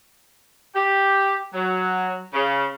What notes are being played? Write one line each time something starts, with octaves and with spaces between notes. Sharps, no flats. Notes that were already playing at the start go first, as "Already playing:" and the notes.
G4
F#3
C#3